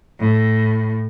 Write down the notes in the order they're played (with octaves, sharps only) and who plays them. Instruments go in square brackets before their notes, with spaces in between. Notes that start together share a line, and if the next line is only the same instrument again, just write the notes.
[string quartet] A2